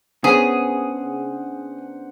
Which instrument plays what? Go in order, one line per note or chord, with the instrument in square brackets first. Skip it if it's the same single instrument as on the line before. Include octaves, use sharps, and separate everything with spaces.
[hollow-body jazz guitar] C#3 B3 [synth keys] D4 C5 F#5 [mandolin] G#4